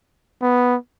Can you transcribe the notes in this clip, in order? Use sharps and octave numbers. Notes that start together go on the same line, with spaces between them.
B3